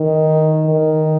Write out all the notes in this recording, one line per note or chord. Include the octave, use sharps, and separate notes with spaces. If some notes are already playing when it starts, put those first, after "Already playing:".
Already playing: D#3
D#3